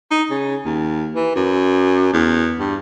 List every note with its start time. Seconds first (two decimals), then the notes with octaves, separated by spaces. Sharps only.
0.11 D#4
0.30 C#3
0.65 D#2
1.15 E3
1.36 F#2
2.13 E2
2.60 G2